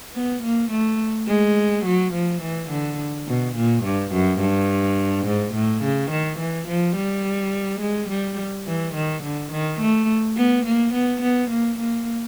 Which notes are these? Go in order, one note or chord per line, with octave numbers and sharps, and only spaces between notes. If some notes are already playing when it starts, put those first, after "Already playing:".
B3
A#3
A3
G#3
F#3
F3
E3
D3
B2
A#2
G2
F#2
G2
G#2
A2
C#3
D#3
E3
F3
G3
G#3
G3
E3
D#3
D3
D#3
A3
B3
A#3
B3
B3
A#3
A#3